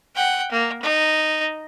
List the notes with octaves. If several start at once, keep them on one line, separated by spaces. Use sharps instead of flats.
F#5 G5
A#3
D#4